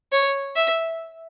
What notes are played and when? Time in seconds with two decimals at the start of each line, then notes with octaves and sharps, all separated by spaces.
0.12 C#5
0.56 E5